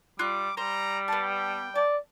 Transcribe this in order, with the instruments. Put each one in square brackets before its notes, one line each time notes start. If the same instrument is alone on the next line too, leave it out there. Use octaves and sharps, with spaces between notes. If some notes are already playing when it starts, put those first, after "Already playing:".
[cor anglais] G3 [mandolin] F4 F#6 [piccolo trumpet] D6
[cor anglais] G3 [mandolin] C5 [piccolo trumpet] A#5
[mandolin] B3 A5 [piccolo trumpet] G5
[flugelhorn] D5 [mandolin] A5